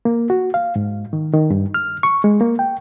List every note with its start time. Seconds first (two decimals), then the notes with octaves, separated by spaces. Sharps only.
0.05 A#3
0.30 F#4
0.54 F5
0.76 G#2
1.13 D#3
1.34 D#3
1.50 G2
1.74 F6
2.03 C#6
2.24 G#3
2.41 A#3
2.59 G5